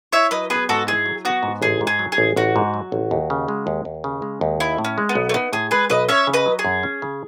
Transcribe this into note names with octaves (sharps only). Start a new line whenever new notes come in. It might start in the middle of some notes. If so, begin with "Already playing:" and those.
E4 C#5 E5
F#3 B4 D#5
B3 G#4 B4
G#2 F#4 A4
E4 G#4
F#3
B3 F#4
G#2
A1 G#4
G#2
G#4
F#3
G#4
A1
A1 F#4
G#2
F#3
A1
D#2
C#3
G#3
D#2
D#2
C#3
G#3
D#2
D#4 E4
A2
C#4
G#3
B3
B1
A3
B3 D#4
A2 G#4
G#3 G#4 B4
B1 B4 D#5
C#4 C#5 E5
C#3
B4 D#5
F#3
G#4
F#2
C#4
C#3